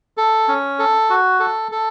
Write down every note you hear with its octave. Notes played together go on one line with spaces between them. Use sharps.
A4
C#4
A4
F#4
A4
A4